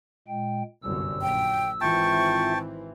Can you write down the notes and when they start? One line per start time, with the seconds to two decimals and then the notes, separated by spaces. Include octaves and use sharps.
0.28 A#2 G#3 G5
0.83 G1 C2 F#2 E6
1.21 A#1 G5
1.81 G#1 E3 C4 F4 E5 G5 A5 C#6